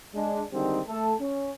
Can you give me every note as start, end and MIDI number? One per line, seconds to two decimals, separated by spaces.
0.15 0.42 56
0.15 0.42 62
0.52 0.80 50
0.52 0.80 51
0.52 0.80 55
0.52 0.80 56
0.52 0.80 60
0.52 0.80 63
0.88 1.14 57
0.88 1.14 69
1.21 1.53 61